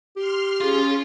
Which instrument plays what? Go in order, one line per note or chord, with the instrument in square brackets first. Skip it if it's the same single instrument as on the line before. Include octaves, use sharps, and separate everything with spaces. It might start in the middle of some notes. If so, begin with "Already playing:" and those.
[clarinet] G4 [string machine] C6 F6
[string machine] C#4 [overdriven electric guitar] F4 [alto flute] G#4